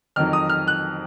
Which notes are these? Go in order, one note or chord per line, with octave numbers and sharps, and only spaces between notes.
F2 D#3 F#3 F6
D#6
F6
F#6